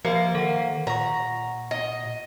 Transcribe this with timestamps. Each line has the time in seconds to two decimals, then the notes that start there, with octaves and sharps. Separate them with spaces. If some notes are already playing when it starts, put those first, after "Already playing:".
0.05 F3 A#3 G4 C5 E5
0.35 D#3 A4 F#5
0.87 A#2 F#5 A#5 C#6
1.71 D#5